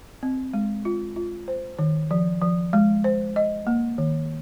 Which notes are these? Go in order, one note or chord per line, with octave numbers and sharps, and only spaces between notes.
C4
G#3
F4
F4
C5
D#3
F3
F3
G#3
C5
D#5
A#3
D#3